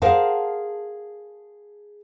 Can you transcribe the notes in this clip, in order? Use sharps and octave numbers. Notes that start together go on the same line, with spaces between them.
G#4 A#4 C5 F5 F#5 A5